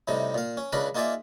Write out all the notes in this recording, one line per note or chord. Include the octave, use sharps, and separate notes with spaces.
A2 C3 G3 D#4
A#2 F5
C#4
C#2 C#3 D4 A#4 B4 B5
A#3 D#4 F4 G#4 D5 E5